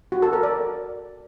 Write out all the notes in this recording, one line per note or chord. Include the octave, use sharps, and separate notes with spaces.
F#4
A4
A#4
D5